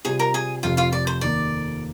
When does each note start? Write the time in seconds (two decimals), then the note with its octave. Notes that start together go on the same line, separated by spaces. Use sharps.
0.05 C3 G3 C4 F4 G#4 G#5
0.19 A#4 A#5
0.34 G#4 G#5
0.63 F1 F2 C3 F4 F5
0.77 F4 F5
0.93 D5
1.07 C5
1.21 D#2 D#3 A#3 D5